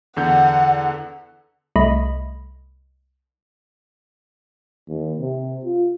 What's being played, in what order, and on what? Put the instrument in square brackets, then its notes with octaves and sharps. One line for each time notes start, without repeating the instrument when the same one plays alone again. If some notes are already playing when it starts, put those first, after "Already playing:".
[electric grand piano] E2 D3 G6 [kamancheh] F#5
[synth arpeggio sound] C2 A3 D#5 B5
[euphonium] D#2
C3
F4